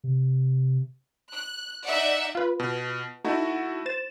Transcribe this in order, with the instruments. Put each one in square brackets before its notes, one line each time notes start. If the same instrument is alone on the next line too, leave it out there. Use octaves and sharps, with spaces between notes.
[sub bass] C3
[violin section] F#6
D#4 D5 E5 F#5
[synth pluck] F4 B4
[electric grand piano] B2
[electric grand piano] A3 E4 F#4 [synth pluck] D#4
[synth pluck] C5 A6 E7